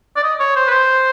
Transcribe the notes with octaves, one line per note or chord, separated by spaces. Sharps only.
D5
D#5
C#5
C5
B4
C5